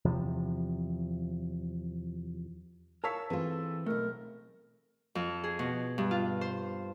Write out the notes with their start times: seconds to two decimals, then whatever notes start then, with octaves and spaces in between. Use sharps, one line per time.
0.05 E2 C3 F3
3.04 A#4 C#5 F5 A5 C#6 E6 B6
3.30 E3 C4 F4 G#4 A4 B4
3.86 B1 A3 A#4
5.15 F2
5.44 G#4
5.59 B2
5.98 G2
6.11 F4
6.41 C5